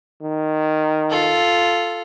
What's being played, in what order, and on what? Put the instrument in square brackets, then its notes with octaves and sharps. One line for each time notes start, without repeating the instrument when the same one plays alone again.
[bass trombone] D#3
[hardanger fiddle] F4 A4